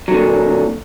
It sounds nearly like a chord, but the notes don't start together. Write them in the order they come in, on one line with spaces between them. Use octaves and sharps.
F#3 D3 A#2